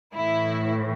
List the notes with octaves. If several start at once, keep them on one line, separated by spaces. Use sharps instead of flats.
A2 E3 E4